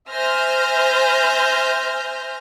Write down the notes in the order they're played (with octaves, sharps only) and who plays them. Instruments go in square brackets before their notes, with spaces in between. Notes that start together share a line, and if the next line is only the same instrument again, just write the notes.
[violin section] C5 E5 G#5 F6 G6 A#6